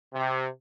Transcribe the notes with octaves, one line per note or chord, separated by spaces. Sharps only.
C3